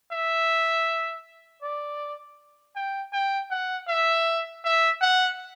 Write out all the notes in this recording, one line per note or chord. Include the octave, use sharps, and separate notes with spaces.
E5
D5
G5
G5
F#5
E5
E5
F#5